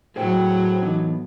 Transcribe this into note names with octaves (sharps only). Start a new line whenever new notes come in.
A2 F#3 G#4 C5 G5
E3 B3 D#4